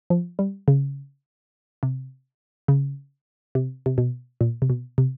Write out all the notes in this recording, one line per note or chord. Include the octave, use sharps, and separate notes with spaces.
F3
G3
C#3
C3
C#3
C3
C3
B2
A#2
C3
B2
C3